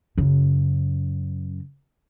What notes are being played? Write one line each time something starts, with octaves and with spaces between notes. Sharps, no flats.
F#2 C#3